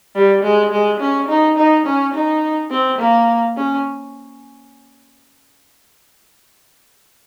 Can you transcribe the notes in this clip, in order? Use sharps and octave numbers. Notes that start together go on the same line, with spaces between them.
G3
G#3
G#3
C#4
D#4
D#4
C#4
D#4
C4
A#3
C#4